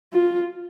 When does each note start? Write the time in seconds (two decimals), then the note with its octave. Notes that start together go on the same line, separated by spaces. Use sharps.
0.13 F4